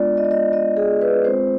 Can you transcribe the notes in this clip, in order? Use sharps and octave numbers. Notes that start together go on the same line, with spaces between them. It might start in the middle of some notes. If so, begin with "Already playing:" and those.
Already playing: G#3 B3 D4 F4 D5
D#5
D5
D#5
D#5
G#4
B4
G#3 C4 F4 C5